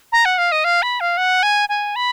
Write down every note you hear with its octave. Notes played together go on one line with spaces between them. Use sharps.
A#5
F#5
F5
D#5
F5
B5
F5
F#5
G#5
G#5
B5